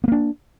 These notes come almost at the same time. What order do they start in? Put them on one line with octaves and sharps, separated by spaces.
B3 A#3 D4